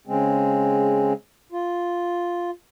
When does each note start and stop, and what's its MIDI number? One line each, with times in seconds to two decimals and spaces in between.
0.07 1.13 49
0.07 1.13 56
0.07 1.13 60
1.52 2.51 65